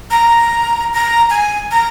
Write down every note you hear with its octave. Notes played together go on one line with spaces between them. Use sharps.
A#5
A#5
G#5
A#5